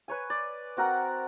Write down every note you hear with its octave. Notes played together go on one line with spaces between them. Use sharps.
B4 C#5 G#5
D5
C4 F#4 A#4 F#5